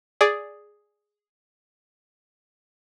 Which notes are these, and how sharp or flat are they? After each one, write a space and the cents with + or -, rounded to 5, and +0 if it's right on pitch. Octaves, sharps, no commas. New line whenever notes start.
G#4 +0 D5 +0